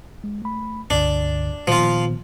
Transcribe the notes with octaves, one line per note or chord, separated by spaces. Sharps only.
G#3
A3 B5
C#2 G2 D3 D4
A#2 D#3 F3 B3 F4